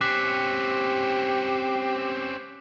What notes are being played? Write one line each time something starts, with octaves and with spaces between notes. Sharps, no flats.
C4 C#4 G4 D6 F#6 B6